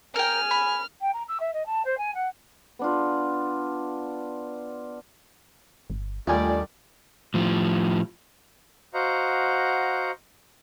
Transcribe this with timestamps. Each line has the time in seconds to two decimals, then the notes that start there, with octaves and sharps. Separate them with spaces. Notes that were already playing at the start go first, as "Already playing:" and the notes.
0.16 G#4 A#4 G5 G#5 F6
0.51 B5
1.00 G5
1.13 A#5
1.28 E6
1.40 E5
1.53 D#5
1.66 A5
1.85 C5
1.97 G#5
2.14 F#5
2.79 B3 D4 F4
5.90 G1
6.27 D#2 D#3 G3 A3 D4 F4 D5 G#5
7.34 A2 F3
8.94 F#4 C5 D#5 F5 F#5 A#5